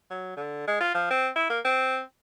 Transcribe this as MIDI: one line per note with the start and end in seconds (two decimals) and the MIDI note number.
0.11 0.34 54
0.37 0.67 50
0.67 0.78 56
0.80 0.92 65
0.95 1.06 53
1.10 1.28 60
1.36 1.45 64
1.50 1.59 58
1.65 2.01 60